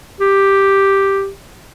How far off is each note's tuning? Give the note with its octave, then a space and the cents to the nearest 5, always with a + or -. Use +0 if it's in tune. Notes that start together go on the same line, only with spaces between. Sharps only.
G4 +0